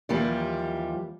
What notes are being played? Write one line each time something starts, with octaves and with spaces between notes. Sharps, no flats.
D#2 E3 F3 G3 G4